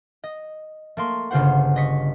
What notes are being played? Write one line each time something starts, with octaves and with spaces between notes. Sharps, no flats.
D#5
A3 A#3 C6 C#6
G1 C#3 F4 C5 F#5
D#5 C#6 B6 C#7